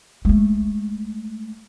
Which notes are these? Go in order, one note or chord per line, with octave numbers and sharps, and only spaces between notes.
G#3 A3